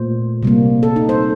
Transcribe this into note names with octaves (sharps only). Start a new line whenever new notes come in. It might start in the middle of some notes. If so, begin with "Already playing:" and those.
Already playing: A#2 A3 C5
C3 G3 A#3
A4
D#4
C5